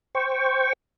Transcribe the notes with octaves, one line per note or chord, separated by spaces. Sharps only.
C5 G5 C#6